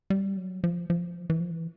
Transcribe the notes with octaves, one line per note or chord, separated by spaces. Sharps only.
G3
F#3
F3
F3
E3
F3
E3